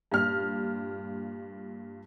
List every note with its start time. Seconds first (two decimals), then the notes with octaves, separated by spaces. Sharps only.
0.12 G2 A#2 F6